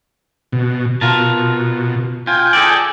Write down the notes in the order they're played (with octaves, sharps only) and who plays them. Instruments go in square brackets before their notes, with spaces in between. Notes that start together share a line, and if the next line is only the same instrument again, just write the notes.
[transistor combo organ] B2
[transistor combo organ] B2 [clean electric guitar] F4 A#4 A5
[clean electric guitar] F4 [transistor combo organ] G5 G#5
[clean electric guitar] G#4 A4 D5